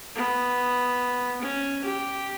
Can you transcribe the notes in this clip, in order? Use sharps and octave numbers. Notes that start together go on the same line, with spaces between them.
B3
C#4
G4